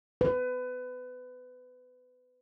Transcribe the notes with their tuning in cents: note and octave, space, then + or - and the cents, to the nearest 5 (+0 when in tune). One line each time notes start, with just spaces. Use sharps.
B4 +25